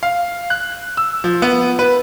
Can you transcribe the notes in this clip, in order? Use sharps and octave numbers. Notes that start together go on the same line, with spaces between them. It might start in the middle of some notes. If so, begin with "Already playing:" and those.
F5
F#6
E6
F3
B3
B4